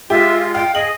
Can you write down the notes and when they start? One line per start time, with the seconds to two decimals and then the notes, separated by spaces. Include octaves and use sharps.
0.10 G#3 F4 G4 E5
0.55 F5 G5
0.75 G#4 D#5 F#7